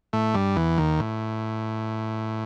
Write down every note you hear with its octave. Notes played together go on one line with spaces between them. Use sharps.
A2 A3
G2 G3
E2 E3
D#2 D#3
A2